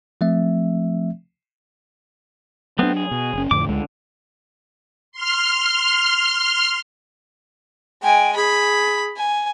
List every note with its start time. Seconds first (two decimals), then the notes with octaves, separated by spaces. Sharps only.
0.21 F3 A3 C4 E5
2.79 F#3 A3 B3 C4 D4
2.97 G#4
3.11 B2
3.34 F#1 C#4
3.51 F2 A2 D3 D6
3.69 C#2 D3 G#3
5.12 C6 F6
8.03 G#3 G5 G#5
8.36 G#4 B5
9.17 G#5